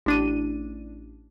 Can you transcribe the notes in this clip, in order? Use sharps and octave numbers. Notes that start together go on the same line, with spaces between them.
A1 D4 D#7